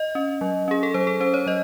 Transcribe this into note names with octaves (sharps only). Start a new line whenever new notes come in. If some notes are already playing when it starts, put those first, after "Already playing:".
Already playing: D#5
C#4
F#3
C#4 G#4
A4
F#3 C5
A4
C#4 C5
C#5
F#3 D#5